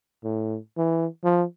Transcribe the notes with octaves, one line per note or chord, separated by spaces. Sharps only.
A2
E3
F3